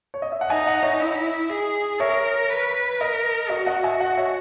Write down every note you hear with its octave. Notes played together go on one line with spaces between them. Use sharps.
C#5
D#5
E5
F#5
D#4 E5 G#5
D#5 F#5
C#5 E5
E4 D#5
G#4
A#4 C#5 E5
B4
A#4 D#5
F#4 D#5
D#5 F#5
E5 G#5
D#5 F#5
C#5 E5